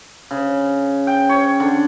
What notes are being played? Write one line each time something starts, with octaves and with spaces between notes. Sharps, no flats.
C#3
G5
C#5
D3